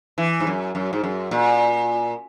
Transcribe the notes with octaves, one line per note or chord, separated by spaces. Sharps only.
E3
G#2
F#2
F#2
G#2
F#2
A#2